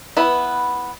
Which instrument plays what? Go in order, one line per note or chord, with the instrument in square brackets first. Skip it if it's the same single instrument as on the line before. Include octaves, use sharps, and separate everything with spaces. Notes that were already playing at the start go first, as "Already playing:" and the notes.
[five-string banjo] B3 E4 B4